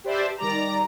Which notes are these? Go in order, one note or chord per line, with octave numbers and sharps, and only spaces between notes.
G4 B4 C5 D5 E5 A5
D#3 G3 D5 A#5